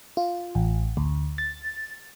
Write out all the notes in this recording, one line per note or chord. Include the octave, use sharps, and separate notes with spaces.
F4
A1
D2
A6